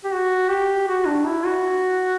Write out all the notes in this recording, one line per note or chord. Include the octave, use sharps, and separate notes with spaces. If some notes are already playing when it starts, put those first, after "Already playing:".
G4
F#4
G4
F#4
D4
E4
F#4